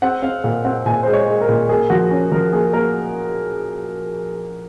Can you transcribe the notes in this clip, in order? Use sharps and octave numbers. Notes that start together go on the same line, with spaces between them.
C4 F#5
C4 F5
A#2 F5
C4 F#5
A#2 G#5
G#3 C5
C#5
G#3
A#4
A#2
A#3 G#4
F3 F#4
C#4
F3 A#4
A#3 G#4
A#3 A#4